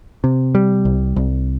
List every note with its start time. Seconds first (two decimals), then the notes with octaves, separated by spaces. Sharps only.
0.24 C3
0.55 G3
0.85 C2
1.16 C2